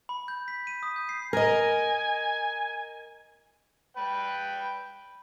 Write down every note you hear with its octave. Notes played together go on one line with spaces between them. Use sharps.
B5
G6
B6
D#7
D#6
G6
C7
A#4 D#5 G#5
B4 G5